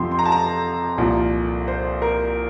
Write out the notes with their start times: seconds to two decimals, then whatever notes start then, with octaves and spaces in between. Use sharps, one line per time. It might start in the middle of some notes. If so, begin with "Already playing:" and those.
Already playing: F2 C3 F3 C6
0.11 C6
0.19 A#5
0.25 A5
0.32 A#5
0.98 C2 A#2 F3
1.68 C5
2.02 A#4